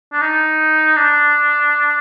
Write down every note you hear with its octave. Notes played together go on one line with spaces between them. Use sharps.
D4
D#4
D4